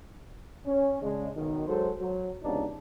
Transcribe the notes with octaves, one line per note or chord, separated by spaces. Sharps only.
C#4
C#3 G#3 D4
B1 D#3
F#3 G#3 F#4 A4 C5
F#3
C#2 C3 E3 B3 D4 D#4